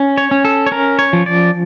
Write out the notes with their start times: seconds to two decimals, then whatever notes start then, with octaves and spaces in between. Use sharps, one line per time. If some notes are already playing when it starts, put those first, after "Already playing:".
Already playing: C#4
0.18 C#5
0.31 C#4
0.45 A4
0.66 C#5
0.71 C#4 A#4
0.99 C#5
1.13 F3
1.26 D5